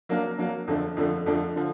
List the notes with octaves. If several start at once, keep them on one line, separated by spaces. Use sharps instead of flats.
F#3 A#3 D4
F#3 A#3 D4
F2 D3 F3 A3 D4
F2 D3 F3 A3 D4
F2 D3 F3 A3 D4
D3 F3